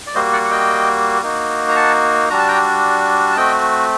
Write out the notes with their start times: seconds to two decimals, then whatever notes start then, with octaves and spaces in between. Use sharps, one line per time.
0.07 D5
0.15 G3 A#3 F#4 C5 D#5
0.33 D5 F#5
0.45 F#5
0.51 D#5 G5
1.22 A#3 D#4 F#4
1.69 A#5
1.76 F#5 A5
2.30 G3 D4 F#4 A#5
2.39 A5
2.48 G5 A#5
3.32 A5
3.37 A3 C4 F#4 D#5 G5